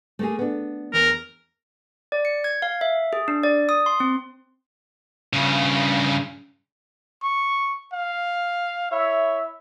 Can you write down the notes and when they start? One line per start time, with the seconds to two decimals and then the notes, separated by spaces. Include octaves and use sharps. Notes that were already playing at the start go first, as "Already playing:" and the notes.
0.19 A3 A#3 G#4
0.39 B3 D4
0.94 E2 A#4
2.12 D5
2.25 C#7
2.44 G#6
2.62 F5
2.81 E5
3.13 G#4
3.28 D4
3.43 D5
3.69 D#6
3.86 C6
4.00 C4
5.33 G2 C#3
7.23 C#6
7.93 F5
8.92 E4 C#5 E5